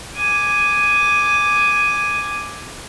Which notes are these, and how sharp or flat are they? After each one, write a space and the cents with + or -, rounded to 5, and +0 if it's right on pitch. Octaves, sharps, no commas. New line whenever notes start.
G#5 +0 D6 +5